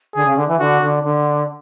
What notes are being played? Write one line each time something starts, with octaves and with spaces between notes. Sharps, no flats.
D3 G#4
C#3
D3
E3
D3 F#4
D3
D3